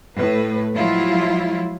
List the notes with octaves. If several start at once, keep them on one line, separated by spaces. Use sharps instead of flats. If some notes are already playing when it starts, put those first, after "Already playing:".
A2 A3 B4
F3 F#3 G#3 E4 F4